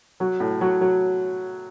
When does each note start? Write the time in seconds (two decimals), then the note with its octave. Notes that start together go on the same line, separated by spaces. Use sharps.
0.20 F#3
0.40 A2
0.61 F#3
0.81 F#3